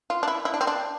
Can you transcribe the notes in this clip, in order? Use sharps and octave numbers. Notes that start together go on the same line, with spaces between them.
F4
D4
E4
E4
D4
C4
D4